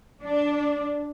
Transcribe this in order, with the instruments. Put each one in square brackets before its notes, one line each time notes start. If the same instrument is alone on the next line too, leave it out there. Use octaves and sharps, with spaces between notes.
[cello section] D4